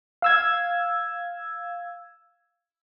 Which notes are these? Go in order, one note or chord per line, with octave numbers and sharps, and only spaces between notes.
F5 E6 G#6